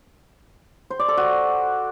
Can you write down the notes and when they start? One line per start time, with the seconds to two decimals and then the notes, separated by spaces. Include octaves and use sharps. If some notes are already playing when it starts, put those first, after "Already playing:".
0.90 C5
0.99 D5
1.08 A4
1.17 F#4